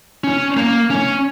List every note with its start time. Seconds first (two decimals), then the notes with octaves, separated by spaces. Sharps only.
0.24 C#4
0.57 A#3
0.90 C#4